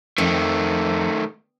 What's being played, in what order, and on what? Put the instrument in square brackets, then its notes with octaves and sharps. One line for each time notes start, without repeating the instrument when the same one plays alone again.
[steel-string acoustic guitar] F2 [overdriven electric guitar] D#3 A3